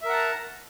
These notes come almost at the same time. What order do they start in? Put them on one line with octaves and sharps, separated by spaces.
E5 A#4 F#5 A5 A#5